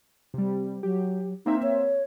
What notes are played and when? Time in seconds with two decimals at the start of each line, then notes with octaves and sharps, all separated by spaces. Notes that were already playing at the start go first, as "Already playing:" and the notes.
0.34 C3 G3
0.83 F#3 G4
1.46 A#3 C4 D#4 E5
1.63 C#5